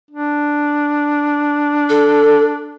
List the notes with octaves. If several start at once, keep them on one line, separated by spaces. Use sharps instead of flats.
D4
A4